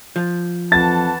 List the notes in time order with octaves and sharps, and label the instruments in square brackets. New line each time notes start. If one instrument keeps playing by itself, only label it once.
[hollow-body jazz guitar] F3
[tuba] F2 [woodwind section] E3 F#5 A5 [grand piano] A6